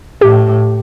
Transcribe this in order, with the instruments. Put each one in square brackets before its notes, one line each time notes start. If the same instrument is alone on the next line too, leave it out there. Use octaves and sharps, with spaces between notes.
[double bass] A2 [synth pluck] G4